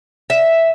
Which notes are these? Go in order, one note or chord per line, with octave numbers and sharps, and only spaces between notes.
E5